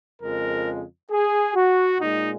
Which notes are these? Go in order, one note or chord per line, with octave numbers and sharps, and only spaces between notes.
F2 C#3 F3 G#3 A#4
G#4
F#4
A#2 G#3 D#4